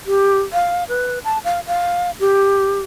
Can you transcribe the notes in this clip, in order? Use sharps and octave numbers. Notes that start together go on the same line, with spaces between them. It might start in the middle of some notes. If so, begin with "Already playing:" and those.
G4
F5
B4
A5
F5
F5
G4